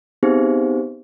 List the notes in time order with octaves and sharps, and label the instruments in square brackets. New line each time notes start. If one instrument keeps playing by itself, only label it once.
[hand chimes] B3 C4 D#4 G4 G#4 C5